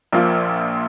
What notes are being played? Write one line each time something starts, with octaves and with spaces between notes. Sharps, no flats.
A#1 A#2 F3 A#3 F4